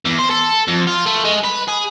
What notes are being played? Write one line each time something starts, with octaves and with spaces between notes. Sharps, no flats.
E2
C5
A4
F2
F4
A3
G#3
B4
G#4